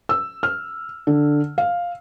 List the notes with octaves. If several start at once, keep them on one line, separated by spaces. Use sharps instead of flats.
E6
F6
D3
F5